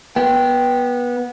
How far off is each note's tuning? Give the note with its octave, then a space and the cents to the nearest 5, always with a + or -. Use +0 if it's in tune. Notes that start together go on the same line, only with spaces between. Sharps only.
B3 -20 G5 -5